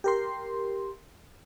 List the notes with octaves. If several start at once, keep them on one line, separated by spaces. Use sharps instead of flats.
G4 A#4 C6